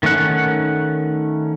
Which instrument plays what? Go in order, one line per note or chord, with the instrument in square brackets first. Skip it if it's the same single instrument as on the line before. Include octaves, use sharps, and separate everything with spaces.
[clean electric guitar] D#3 A3 C#4 F#5